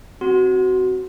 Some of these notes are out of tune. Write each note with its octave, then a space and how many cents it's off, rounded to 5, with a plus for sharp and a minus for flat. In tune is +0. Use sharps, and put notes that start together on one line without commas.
C4 +0 F#4 +20